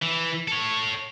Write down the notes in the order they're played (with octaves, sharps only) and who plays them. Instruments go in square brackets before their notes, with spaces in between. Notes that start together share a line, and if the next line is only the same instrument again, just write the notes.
[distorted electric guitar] E3
A4 C#5